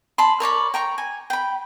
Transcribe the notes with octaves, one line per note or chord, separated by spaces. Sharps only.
A5 B5 C6
A#4 C#5 D5 B5
G5 A#5 C#6
G#5
G5 B5